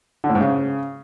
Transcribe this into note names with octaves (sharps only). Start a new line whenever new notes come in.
D3
A2
G#2
C#3